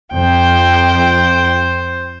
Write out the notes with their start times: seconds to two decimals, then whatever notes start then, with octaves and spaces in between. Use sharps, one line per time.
0.13 F2 C5 G5